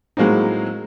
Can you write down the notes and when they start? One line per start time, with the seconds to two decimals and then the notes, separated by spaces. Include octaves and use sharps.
0.17 A2 F#3 G#3 A#3 C4 D#4